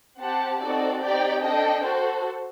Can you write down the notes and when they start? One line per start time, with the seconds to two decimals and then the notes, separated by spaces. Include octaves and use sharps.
0.19 C4 G4 C5 F#5 A5
0.61 C4 D#4 F#4 A4 D5
1.01 C4 D#4 G4 D5 G5
1.43 D4 A4 D#5 G5
1.83 F#4 A4 C5